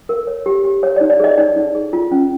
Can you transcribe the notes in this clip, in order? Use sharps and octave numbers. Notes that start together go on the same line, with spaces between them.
A#4
C#5
G4
G4
C#5
D5
D#4
D5
G#4 D#5
D#4 D5
D#4
G#4
F4
C#4